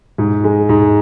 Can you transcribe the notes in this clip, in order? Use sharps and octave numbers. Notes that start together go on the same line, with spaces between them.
G#2
G#3
G#2